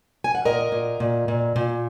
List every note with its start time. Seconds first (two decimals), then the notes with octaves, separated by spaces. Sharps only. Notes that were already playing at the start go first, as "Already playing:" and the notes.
0.24 G#5
0.35 F#5
0.45 A#2 A#4 D#5
0.72 A#2
1.00 A#2
1.28 A#2
1.56 A#2